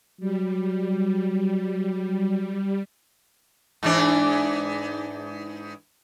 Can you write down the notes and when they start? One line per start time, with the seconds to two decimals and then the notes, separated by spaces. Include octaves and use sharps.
0.20 F#3 G3
3.83 G#2 E3 D4